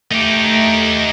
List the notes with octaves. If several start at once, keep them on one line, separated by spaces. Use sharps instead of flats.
A3 D#4 G4